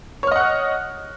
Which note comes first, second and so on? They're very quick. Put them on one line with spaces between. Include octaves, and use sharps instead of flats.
C#5 F6 D#5 F#5 F#6